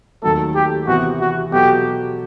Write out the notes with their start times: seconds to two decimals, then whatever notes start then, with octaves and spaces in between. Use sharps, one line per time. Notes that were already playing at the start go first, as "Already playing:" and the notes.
0.22 D#2 D#3 F#3 A3 A4
0.55 G4
0.87 C3 E3 B3 F#4
1.20 F#4
1.51 B2 F#3 B3 F#4 G4 A4